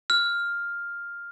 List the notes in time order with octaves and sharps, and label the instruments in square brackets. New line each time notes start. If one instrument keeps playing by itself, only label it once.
[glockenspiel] F6